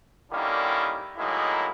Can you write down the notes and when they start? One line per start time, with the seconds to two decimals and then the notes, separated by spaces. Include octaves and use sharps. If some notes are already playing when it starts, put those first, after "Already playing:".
0.32 D3 D#3 G3 A#3 C#4 E4
1.18 A2 F#3 G#3 A#3 D#4 E4